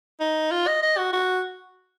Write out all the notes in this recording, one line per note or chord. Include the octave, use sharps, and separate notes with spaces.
D#4
F4
D#5
D#5
F#4
F#4